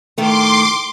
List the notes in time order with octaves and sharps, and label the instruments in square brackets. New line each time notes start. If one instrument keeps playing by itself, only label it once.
[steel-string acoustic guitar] A2 D#3 A3 [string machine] C6 D6